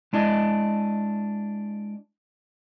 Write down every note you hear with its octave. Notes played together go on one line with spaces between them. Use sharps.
G#3 D4 E4 D#5